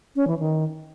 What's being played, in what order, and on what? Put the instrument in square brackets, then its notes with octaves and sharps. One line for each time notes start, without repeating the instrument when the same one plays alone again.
[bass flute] C#4
E3
D#3